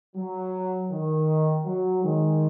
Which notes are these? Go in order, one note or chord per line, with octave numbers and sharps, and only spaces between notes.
F#3
D#3
F#3
D#3 G#3